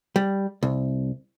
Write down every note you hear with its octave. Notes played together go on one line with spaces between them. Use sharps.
G3
C2